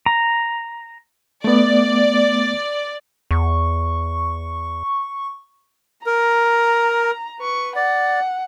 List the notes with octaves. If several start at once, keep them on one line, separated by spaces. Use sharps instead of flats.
A#5
A3 B3 D5
E2 C#6
A#4 A#5
B4 C#6
D5 F#5